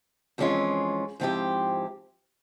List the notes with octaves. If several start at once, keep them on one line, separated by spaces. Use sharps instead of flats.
F2 E3 G#3 C#4 F4
G#2 F3 C4 E4 G4